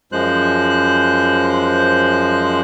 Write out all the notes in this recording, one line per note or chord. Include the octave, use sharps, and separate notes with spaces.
F#2 F3 G#3 C5 F#6